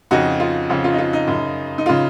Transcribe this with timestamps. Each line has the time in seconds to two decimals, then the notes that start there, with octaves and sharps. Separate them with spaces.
0.11 F2 C#3 D#4 F#4
0.40 F4
0.69 F2 C#3
0.84 F4
0.93 D#4
0.98 F4
1.13 D#4
1.27 F#2 C#3
1.78 D#4
1.86 C#3 F4